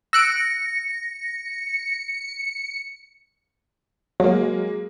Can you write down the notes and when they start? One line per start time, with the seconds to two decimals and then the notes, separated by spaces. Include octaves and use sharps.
0.13 E6 F#6 A#6 C#7 D7
4.20 F#3 G#3 A#3